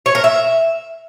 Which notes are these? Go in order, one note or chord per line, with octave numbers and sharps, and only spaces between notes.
C#5
A#4
E5